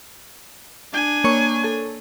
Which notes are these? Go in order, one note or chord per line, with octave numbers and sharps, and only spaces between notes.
D4 G#5
A#3 C#5 C#6
A4